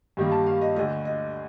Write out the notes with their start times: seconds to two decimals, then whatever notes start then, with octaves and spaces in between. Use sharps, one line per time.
0.17 G2 D#3 G3 A#3
0.32 A5
0.46 F5
0.61 D#5
0.76 D2 D3 A3 D#5
1.05 D#5